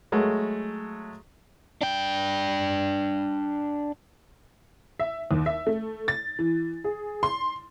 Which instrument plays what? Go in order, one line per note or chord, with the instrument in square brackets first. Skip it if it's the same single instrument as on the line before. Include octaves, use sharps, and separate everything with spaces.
[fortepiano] F#3 G#3 A3 F#4
[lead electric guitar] D4 G5
[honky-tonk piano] E5
D#2
E5
A3
A6
E3
G#4
C6